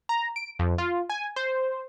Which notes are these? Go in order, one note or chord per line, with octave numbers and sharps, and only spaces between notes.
A#5
D7
F2
F4
G#5
C5